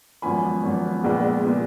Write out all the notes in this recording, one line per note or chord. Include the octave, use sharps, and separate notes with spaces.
G#1 F#2 F3 B3 G#5 B5
G#1 F#2 F3 B3
A#1 A#2 G#3 B3
A#2 G#3 B3